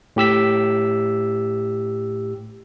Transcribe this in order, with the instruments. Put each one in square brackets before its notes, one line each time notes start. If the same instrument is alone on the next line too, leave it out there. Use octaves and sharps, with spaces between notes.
[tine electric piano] A2 G4 E6 B6